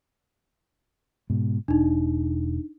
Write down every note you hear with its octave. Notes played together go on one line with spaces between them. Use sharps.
G#2 B2
E1 D4 D#4